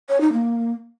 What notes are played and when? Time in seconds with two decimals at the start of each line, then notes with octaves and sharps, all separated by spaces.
0.09 C#5
0.21 D#4
0.33 A#3